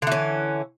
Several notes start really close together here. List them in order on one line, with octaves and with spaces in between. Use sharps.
D3 E3 C#4